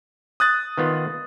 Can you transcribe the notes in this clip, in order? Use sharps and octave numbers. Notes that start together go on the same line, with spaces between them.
D#6 F#6 A6
D#3 B3 F4